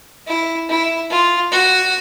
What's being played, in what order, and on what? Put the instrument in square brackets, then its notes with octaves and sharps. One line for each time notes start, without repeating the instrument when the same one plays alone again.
[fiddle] E4
E4
F4
F#4